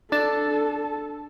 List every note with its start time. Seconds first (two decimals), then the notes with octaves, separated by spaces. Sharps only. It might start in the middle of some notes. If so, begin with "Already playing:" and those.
0.12 D4 A4 A5